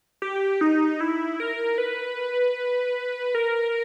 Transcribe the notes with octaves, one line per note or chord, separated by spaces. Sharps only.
G4
D#4
E4
A#4
B4
A#4